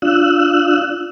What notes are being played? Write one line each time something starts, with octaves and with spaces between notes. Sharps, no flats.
D4 F4 E6 F#6